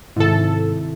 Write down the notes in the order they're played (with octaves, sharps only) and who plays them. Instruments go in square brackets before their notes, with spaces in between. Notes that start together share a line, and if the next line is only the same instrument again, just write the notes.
[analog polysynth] G#2 A4 [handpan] C3 D#3 E4